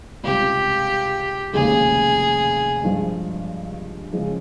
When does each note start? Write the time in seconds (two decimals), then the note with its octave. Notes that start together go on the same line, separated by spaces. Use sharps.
0.23 C#2 C3 G3 G4
1.53 F1 D#2 C#3 G#3 G#4
2.83 G2 F3 G#3
4.13 C#3 F3 G#3